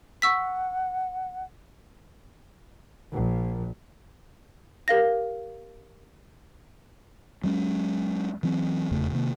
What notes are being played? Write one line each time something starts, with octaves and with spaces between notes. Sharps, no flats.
F#5 C#6 E6 B6
A#1
G4 A#4 F5 A#6
F#3 G#3 C#4
E3 F#3 C4
F1 E2 C#3 A3
C3 D#3 A#3